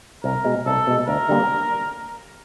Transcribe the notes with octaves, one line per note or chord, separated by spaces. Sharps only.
C2 A#4
B2 G#3
C2 A4
B2 G#3
D2 A#4
D3 G3 A#3